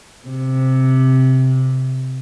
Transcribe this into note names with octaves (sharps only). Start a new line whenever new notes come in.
C3